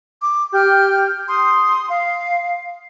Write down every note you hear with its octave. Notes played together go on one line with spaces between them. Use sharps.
D6
G4 G5 F6 G6
C6 D#6
F5